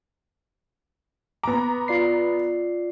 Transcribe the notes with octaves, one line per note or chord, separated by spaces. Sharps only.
B3 A#5 D6
F4 D5 C7